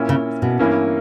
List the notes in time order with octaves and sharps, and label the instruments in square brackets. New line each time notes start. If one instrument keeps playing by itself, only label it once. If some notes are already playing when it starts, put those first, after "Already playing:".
Already playing: [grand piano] A#2 A#3 C#4 E4
[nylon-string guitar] C#3
B2
[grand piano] G2 E3 A#3 C#4 E4